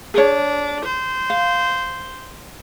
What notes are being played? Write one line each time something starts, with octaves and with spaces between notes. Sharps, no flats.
D4 G#4 C#5
C5
F5